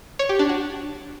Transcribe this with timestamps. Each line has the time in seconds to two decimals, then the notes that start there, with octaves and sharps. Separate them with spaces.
0.19 C#5
0.29 G4
0.39 D4
0.49 F#4